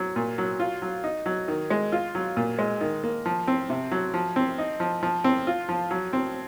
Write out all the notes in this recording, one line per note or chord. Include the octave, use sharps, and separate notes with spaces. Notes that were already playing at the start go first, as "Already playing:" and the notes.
Already playing: F#3
A#2
F#3
F4
F#3
D#4
F#3
D#3
G#3
F4
F#3
A#2
G#3
D#3
A#3
F3
C4
C3
F#3
F3
C4
D#4
F3
F3
C4
F4
F3
F#3
C4